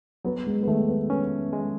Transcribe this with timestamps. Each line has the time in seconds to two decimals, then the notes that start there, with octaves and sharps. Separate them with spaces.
0.25 F#3 B3
0.46 G#3
0.62 B3
0.68 D#3 A3
0.89 B3
1.10 B3 C#4
1.53 G#3